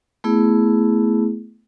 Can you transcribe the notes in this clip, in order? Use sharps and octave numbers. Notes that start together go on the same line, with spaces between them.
A3 B3 E4 G#4